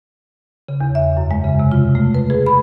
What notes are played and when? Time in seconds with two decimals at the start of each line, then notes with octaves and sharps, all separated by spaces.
0.69 C#3
0.81 E2
0.95 E5
1.17 F#2
1.31 G#3
1.44 C#3
1.59 C3
1.72 F4
1.95 A3
2.15 B4
2.30 G#4
2.46 B5